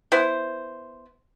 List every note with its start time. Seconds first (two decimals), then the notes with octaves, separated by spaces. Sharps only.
0.12 B3 E4 C5